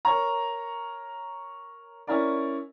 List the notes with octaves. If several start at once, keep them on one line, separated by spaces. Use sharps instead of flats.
A#4 C#5 A#5
C#4 E4 A#4 D5